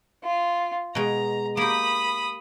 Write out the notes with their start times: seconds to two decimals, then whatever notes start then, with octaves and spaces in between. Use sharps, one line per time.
0.23 F4
0.95 B2 G#3 A#5
1.57 A#3 G4 B5 D#6